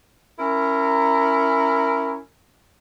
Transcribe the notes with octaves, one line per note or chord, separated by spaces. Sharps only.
C#4 E4 A#4